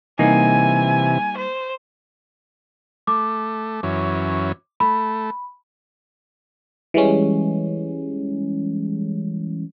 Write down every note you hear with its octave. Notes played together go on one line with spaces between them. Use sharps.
C3 E3 G3 A#3 D#4 G#5
C5
A3 D6
F#2 E3 C#4
A3 B5
E3 G3 G#3 C#4